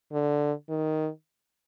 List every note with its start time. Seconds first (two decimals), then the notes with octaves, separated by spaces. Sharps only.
0.12 D3
0.69 D#3